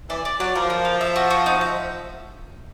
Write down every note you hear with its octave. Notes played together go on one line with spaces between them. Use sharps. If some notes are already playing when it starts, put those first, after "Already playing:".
E3 D5
D5
F#3 D5
F3 A#4
A#4
F5
E5
F#4
F#4
D#4
E5